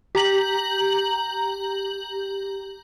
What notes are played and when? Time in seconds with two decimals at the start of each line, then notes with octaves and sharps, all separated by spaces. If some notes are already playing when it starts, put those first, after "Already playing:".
0.15 G4 A#5 F#7